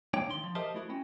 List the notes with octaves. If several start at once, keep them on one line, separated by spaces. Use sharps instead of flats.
A#3 D4 C#5 G5
D#3 C6
F3
G4 A#4 C5 D#5 E5 A5
A3 E4 F#4
C4 C#4